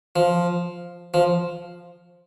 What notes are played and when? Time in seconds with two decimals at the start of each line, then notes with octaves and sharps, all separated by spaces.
0.16 F3
1.14 F3